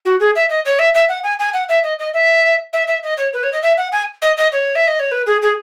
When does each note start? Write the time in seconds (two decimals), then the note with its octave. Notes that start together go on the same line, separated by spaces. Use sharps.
0.05 F#4
0.20 G#4
0.35 E5
0.49 D#5
0.65 C#5
0.79 E5
0.94 E5
1.09 F#5
1.23 G#5
1.39 G#5
1.53 F#5
1.69 E5
1.83 D#5
1.99 D#5
2.13 E5
2.73 E5
2.87 E5
3.03 D#5
3.17 C#5
3.33 B4
3.43 C#5
3.52 D#5
3.62 E5
3.77 F#5
3.92 G#5
4.22 D#5
4.37 D#5
4.52 C#5
4.75 E5
4.87 D#5
4.99 C#5
5.11 B4
5.26 G#4
5.42 G#4